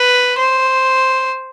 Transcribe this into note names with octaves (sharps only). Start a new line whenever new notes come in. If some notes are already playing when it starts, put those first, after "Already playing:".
Already playing: B4
C5